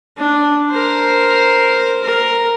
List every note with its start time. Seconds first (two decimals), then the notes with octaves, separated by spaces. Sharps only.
0.17 D4
0.71 A#4 C5
2.03 A#4